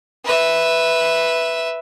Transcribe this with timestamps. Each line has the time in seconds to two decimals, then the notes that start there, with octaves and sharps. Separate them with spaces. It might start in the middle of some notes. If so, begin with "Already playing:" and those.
0.25 B4 E5